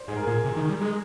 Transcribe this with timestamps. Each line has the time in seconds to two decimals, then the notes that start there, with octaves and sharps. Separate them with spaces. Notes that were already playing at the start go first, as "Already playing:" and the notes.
Already playing: C5 D5
0.08 G#2 G#4
0.16 A#4
0.23 A#2 G#4
0.44 C3
0.56 D#3
0.69 G3
0.81 G#3